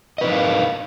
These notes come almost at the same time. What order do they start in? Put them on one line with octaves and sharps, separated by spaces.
D#5 B4 D#4 A#4 F5